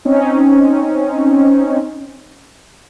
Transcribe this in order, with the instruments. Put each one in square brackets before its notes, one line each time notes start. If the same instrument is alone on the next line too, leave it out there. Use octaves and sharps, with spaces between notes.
[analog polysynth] C4 C#4 D#4